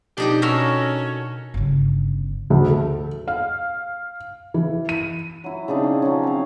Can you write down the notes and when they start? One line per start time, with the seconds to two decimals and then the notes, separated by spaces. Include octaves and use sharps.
0.18 F2 B2 D4 D#4 G4 G5 A#5
0.42 C#4 F#4 A4 A#4
1.54 G1 C#3
2.50 D2
2.69 A4
3.28 F5
4.54 E3
4.89 D#7
5.44 F#3 E4
5.68 C#3 C4 D4 D#4
5.83 C#4
6.02 F3 F#3 C#4
6.23 C4 F5